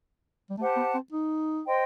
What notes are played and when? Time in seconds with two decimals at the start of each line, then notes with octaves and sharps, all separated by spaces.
0.50 G3
0.58 A3 G4 C5 F#5 A5
0.76 B3
0.94 C4
1.13 D#4
1.66 C5 D#5 G5 C6